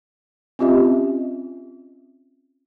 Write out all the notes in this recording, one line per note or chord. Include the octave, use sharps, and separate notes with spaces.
C4 C#4 F4 G4 D#5 E5